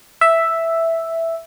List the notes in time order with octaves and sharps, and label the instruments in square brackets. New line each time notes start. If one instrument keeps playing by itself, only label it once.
[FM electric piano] E5